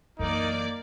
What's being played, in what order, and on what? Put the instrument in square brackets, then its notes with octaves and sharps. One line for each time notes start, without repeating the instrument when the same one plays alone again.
[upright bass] F#2 E3 [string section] A#3 D5 [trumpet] D#4